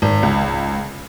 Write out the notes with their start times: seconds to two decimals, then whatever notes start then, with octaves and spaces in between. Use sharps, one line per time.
0.02 G#1
0.23 C#2